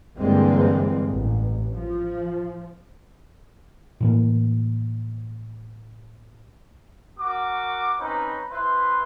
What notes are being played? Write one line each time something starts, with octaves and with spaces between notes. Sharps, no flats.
G2 D3 E3 G#3 A#3 C4
A1
F3
A2 E3 A#3
F#4 A#4 D6
C4 C#4 D#4 B4 C#5
E4 B4 C5 C6